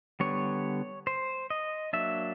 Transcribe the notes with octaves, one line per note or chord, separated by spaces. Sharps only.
D3 G3 B3 C#5
C5
D#5
F#3 A#3 D4 E5